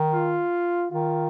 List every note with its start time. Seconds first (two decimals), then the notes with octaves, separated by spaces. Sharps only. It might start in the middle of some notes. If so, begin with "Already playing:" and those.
Already playing: D#3
0.13 F4
0.92 D#3 F4